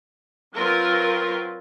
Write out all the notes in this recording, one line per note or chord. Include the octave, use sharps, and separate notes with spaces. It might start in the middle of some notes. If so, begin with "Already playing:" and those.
F#3 C4 F4 A#4 B4